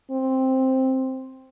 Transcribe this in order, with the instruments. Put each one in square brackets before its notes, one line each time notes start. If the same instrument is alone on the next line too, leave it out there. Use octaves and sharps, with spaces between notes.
[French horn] C4